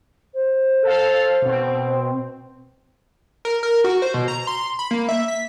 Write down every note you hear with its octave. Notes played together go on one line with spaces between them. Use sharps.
C5
A4 F5
B2 C4
A#4
A#4
F#4
C5
B2
A#5
C6
B5
A#3
E5
B6